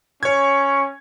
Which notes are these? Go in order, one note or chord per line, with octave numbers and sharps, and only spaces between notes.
C#4 C#5 G#6